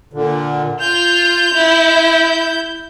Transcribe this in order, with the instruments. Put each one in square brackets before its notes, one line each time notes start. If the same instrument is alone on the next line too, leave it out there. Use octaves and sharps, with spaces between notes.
[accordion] A#2 D3
[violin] F4 F7 [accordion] G6
[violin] E4